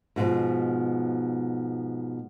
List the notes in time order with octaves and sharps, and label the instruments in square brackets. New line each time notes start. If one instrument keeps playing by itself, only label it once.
[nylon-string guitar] G#2 B2 F3